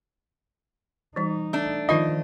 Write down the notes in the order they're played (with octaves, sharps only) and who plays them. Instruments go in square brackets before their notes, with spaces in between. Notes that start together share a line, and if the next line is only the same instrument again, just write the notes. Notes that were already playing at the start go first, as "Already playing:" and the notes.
[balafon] E3 G3 [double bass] D#4
[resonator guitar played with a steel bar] A3 D4
[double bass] D#3 F3 [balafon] D#4 F4 C5 [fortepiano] D#5